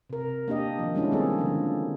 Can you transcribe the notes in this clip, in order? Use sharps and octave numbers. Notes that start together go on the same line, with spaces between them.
C3 A#4
A#3 D4 G4 D#5
D#3 F3
G3 G#3 C#4 D4 E4
D#3 G3 A#3 C4 G#4 A4
D3 F3